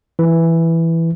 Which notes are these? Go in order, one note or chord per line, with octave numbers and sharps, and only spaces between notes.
E3